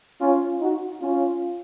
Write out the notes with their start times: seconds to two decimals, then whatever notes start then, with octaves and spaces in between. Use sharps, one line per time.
0.21 C#4 F4
0.61 D#4 F#4
1.01 C#4 F4